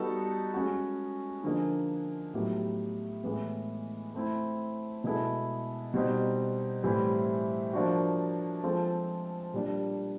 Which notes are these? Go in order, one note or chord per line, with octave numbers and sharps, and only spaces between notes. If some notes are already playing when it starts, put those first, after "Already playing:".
Already playing: G3 B3 D#4 F#4 A4
G#3 C#4 F#4
D3 F3 A#3 D#4 G#4
A2 F#3 B3 D#4 G4
A2 E3 G#3 B3
A3 C4 E4
B2 G#3 B3 E4 A4
B2 G3 C4 D#4
A2 E3 G3 C4 E4
F3 A#3 D4 F#4
F3 G#3 C4 F4 A4
A#2 G3 A#3 D4